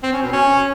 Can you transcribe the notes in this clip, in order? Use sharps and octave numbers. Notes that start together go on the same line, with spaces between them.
C4
C#4
B2
C#4